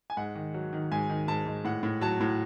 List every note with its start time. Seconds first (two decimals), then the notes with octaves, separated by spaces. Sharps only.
0.10 G#5
0.17 G#2 F#5
0.35 D#3
0.54 F#3
0.73 D#3
0.92 G#2 G#5
1.10 D#3
1.28 G#2 A5
1.47 G#2
1.65 A2 F#5
1.83 A2
2.01 F#3 A5
2.20 A2